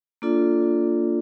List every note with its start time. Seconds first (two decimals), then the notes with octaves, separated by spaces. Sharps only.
0.22 A#3 D4 F4 A4 D5